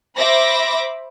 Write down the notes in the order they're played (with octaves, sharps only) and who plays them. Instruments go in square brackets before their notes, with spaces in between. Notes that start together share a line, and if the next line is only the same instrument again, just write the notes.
[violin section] C5 E5 B5 D6 A#6